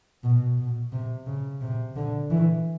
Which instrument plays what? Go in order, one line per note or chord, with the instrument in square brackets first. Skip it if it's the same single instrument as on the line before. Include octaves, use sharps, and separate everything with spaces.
[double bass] B2
B2
C3
C#3
C3
D3
E3